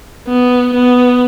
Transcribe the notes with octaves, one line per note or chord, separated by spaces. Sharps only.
B3
B3